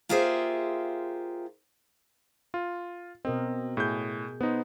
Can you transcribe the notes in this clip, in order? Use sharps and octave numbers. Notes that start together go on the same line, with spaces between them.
A#3 F4 G4 G#4 C5 E5
F4
B2 C4 A#4 D#5
A2 G#4 G6
B3 D#4 C5